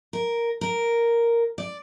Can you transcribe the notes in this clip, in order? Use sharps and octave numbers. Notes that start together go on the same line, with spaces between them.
A#4
A#4
D5